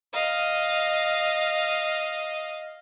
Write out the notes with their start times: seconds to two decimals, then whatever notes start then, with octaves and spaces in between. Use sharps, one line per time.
0.13 D#5 F5